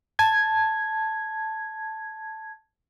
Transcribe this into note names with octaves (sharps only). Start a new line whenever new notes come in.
A5 G#6